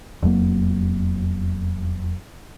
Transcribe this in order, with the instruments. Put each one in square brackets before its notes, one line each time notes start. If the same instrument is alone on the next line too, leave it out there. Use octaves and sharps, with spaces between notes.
[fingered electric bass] E1 F2 F#3 A#3